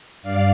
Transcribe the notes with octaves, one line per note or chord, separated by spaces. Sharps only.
G2 D5 F5